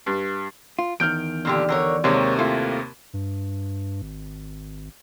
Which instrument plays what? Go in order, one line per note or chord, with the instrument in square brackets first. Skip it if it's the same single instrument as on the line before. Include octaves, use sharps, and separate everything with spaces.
[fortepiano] G2
[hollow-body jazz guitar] F4
[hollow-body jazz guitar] E2 D#3 [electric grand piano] F6 G6 D7
[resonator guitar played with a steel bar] A#2 D3 G4
D3 A#4 C#5
[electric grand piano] D#2 C3 A#3 [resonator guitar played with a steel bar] G#3 C#5
[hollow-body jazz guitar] A3 F4 [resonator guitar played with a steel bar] E4
[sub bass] G2
G#1